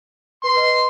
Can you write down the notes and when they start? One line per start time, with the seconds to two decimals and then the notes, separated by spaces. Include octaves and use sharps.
0.44 B4 C6
0.55 B4 D#5